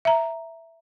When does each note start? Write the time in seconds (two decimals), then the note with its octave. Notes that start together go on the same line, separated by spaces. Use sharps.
0.05 E5 A#5